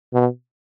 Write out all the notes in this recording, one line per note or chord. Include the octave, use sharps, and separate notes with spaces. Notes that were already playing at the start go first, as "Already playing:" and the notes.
B2